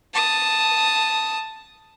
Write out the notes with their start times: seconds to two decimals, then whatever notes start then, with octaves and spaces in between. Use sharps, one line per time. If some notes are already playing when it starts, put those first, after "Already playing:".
0.14 A5 D#6